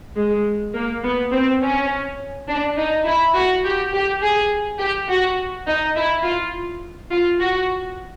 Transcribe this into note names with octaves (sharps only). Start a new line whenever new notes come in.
G#3
A#3
B3
C4
C#4
D4
D#4
E4
F#4
G4
G4
G#4
G4
F#4
D#4
E4
F4
F4
F#4